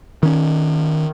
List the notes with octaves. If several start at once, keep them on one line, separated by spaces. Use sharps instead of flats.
D#3 C#4